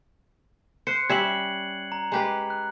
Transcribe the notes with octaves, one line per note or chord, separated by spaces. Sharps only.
C5 F#6 C#7
G3 C#4 E5 G#6 C7 F#7
A#5
G#3 G4 B4
F#6